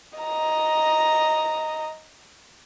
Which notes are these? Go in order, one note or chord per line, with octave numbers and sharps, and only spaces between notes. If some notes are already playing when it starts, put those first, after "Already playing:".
D#5 A#5